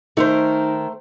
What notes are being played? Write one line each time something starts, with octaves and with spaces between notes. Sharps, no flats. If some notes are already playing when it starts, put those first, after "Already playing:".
D#3 A3 D#4 A#4 C5